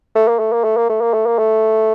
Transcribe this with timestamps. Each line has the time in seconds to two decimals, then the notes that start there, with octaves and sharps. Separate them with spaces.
0.15 A3
0.28 A#3
0.39 A3
0.53 A#3
0.64 A3
0.77 A#3
0.90 A3
1.01 A#3
1.14 A3
1.27 A#3
1.39 A3